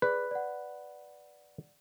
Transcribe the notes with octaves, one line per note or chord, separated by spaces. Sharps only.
G#4 B4 D5
D5 F#5